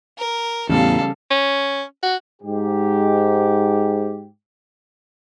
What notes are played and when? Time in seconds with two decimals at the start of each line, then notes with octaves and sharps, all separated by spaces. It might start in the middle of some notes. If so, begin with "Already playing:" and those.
0.18 A#4
0.69 E2 A2 C#3 G3 B3 A4 F5
1.31 C#4
2.03 F#4
2.42 G#2 G4